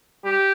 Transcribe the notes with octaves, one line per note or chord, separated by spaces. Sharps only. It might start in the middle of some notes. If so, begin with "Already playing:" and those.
G4